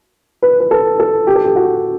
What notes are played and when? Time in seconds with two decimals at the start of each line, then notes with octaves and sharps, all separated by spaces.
0.42 B4
0.60 B4
0.71 A4
1.00 A4
1.27 G4
1.36 A4
1.44 G4
1.56 F#4